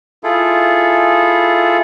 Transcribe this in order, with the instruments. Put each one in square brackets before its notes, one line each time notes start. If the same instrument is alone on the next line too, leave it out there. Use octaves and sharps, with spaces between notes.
[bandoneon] E4 F4 G#4 A4